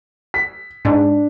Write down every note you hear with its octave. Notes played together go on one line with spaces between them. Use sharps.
B6
G#2 D4